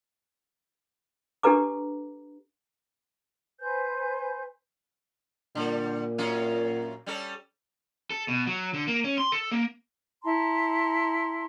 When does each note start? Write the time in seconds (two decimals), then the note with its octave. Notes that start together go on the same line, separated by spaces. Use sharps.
1.43 D4 G4 A4 B4 A#5 D6
3.59 B4 C5 G#5 G6
5.55 A#2 D3 G3
6.18 F#2 C#4 F4
7.06 G3 C#4 A4
8.10 A4
8.28 B2
8.47 F#3
8.74 D3
8.87 A#3
9.04 C#4
9.18 C6
9.32 A4
9.51 A#3
10.24 E4 A5 A#5 C6